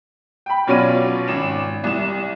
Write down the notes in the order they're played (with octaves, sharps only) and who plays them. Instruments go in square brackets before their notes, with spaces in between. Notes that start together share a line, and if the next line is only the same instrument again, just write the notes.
[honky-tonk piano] G5 B5
B2 F#3 C#4 F4 D5 D#7
G#1 E7
C2 E7